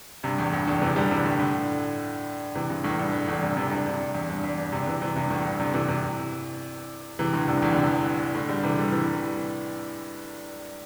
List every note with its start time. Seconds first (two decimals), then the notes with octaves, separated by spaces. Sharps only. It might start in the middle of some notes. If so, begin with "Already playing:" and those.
0.23 G2 C3
0.39 E2 A2
0.53 G2
0.67 E2 A2
0.82 C3 E3
0.96 D3 G3
1.11 C3 E3
1.25 A2 D3
1.39 A2 D3
2.55 C3 E3
2.70 G2 C3
2.84 E2 A2
2.99 G2
3.13 G2
3.28 E2 A2
3.42 G2 C3
3.57 G2 C3
3.71 G2 C3
3.86 G2 C3
4.00 G2
4.15 E2
4.29 G2
4.44 E2
4.58 G2
4.72 G2 C3
4.87 C3 E3
5.02 C3 E3
5.16 G2 C3
5.30 E2 A2
5.45 G2
5.60 G2 C3
5.74 C3 E3
5.88 C3 E3
7.19 C3 E3
7.33 A2 D3
7.48 G2 C3
7.62 E2 A2
7.72 D3
7.77 G2 C3
8.34 A2 D3
8.49 D3 G3
8.63 C3 E3
8.78 D3 G3
8.92 C3 E3